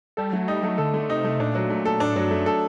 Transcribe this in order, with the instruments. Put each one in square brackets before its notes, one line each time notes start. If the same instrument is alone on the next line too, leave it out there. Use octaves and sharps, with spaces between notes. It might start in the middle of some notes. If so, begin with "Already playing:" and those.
[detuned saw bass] G3 [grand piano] A4
[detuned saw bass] F#3 [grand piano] A3
[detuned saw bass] G3 [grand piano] D#4
[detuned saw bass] F#3 [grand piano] A3
[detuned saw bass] D3 [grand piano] A4
[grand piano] A3
[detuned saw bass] C3 [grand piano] D#4
[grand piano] A3
[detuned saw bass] A#2 [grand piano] D4
[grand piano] F#3
A3
A4
[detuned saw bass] A2 [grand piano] D4
[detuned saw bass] G2 [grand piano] F#3
[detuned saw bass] F#2 [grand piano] A3
[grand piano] A4